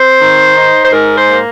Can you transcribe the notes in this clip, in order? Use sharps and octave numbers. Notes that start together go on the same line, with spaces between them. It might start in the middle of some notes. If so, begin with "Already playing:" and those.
Already playing: C4 C5
D#3
D#4
C5
G#2 A#4
C5
A#3